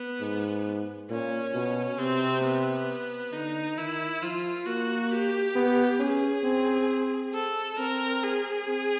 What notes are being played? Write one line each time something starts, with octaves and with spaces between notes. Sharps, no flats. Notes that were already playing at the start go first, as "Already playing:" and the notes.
Already playing: B3
G#2
A#2 C#4
B2
C3 C4
B3
D3 D#4
D#3 E4
F3 F4
A#3 F#4
G4
B3
C#4 G#4
C4
A4
C4 A#4
G#4
C4